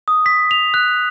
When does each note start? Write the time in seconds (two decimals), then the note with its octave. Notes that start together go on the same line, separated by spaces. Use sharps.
0.08 D#6
0.26 B6
0.51 F7
0.74 F#6